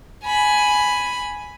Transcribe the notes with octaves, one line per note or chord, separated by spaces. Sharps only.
G#5 B5